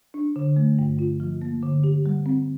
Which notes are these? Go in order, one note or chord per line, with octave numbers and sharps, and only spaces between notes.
D4
D3
A3
G2
F4
F3
A#3
D3
G4
G3
C4